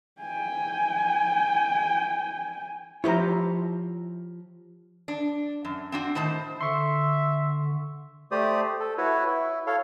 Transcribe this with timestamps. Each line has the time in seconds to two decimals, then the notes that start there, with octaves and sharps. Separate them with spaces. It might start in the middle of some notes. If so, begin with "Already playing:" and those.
0.21 G5 G#5
3.04 F3 E4 G4 C5 C#5 A#5
5.08 D4
5.65 F#2
5.92 C4 D4 F#4
6.15 A2 D#3 C5 A5
6.61 D3 E5 C6 C#6
8.31 A3 G4 C5 D5 D#6
8.80 A4
8.98 E4 F#4 B4 C#5
9.26 E4
9.67 A4 C#5 F5